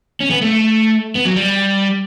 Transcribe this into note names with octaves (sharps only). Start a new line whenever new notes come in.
C#4
B3
A3
B3
F#3
G3